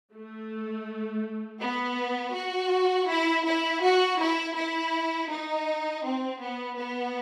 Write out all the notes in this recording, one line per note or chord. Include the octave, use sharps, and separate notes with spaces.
A3
B3
F#4
E4
E4
F#4
E4
E4
D#4
C4
B3
B3